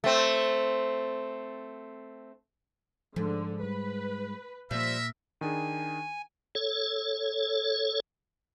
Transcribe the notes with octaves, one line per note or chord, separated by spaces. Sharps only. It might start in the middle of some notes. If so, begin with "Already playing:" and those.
A3 C4
G#2 D3 F3
G3 B4
A#2 F3 G3 A#3 A#4 E5
D#3 D4 G#4 G#5
A4 C#5